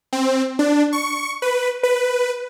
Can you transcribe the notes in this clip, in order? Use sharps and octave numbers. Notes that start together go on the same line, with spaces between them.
C4
D4
C#6
B4
B4